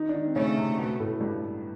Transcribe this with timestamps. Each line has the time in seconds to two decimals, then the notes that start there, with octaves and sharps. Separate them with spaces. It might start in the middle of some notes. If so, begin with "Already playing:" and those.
Already playing: D#3 D#4
0.09 D4
0.15 D#3 D#4
0.26 C4
0.36 C#3 A3 C#4
0.57 C3 C4
0.78 B2 B3
1.00 A2 A3
1.20 G2 G3